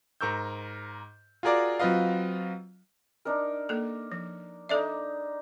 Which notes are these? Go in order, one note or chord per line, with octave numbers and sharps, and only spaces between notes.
G#2 A#4 C#6 E6 G6
F4 F#4 G#4 A#4 D5
F#3 C4 F4 B4 D#5 F5
D4 D#4 A#4
A#3 A4
F3
D4 D#4 A4 D5 E5